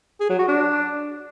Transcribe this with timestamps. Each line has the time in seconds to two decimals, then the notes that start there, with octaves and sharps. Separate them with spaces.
0.20 G#4
0.29 F#3
0.39 F#4
0.48 D4